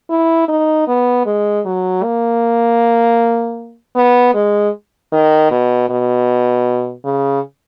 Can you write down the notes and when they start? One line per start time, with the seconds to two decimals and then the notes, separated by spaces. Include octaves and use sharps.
0.10 E4
0.48 D#4
0.88 B3
1.26 G#3
1.65 F#3
2.03 A#3
3.96 B3
4.34 G#3
5.12 D#3
5.51 B2
5.90 B2
7.05 C#3